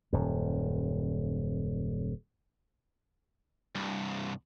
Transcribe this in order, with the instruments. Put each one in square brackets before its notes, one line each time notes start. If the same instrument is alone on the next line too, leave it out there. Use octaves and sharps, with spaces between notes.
[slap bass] D#1 F#2
[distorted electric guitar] C2 G2